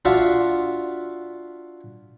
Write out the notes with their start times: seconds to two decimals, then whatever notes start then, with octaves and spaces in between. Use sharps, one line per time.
0.05 D4 F4 F#4 E5 F5 A5